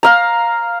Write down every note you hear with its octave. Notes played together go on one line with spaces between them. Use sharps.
F5 A#5